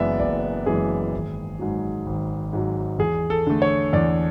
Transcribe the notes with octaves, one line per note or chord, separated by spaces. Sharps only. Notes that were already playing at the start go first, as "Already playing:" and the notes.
Already playing: F#1 F#2 E3 G#3 B3 D5 E5 F#5
F#1 D5
F#2 E3 G#3 B3 G#4
G#1
G#2 F#3
G#1
G#2 F#3
E2 G#4
A4
D3 A3
C#5
E2 D5